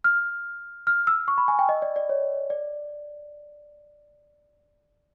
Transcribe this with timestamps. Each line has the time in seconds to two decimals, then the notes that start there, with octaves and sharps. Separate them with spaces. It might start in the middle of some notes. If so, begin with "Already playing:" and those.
0.04 F6
0.87 F6
1.07 E6
1.28 C#6
1.38 B5
1.48 G#5
1.59 G5
1.69 D#5
1.82 D5
1.96 D5
2.09 C#5
2.50 D5